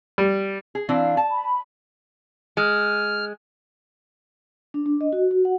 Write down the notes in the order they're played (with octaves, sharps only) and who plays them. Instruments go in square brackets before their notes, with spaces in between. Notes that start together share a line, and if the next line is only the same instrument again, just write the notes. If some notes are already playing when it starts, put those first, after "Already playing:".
[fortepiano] G3
[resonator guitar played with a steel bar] G#4
[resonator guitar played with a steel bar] E3 C4 D4 [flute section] F5
[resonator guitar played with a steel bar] A5
[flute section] B5
[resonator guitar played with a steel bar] G#3 [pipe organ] F6
[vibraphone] D4
D4
D#5
F#4
F#4
F#5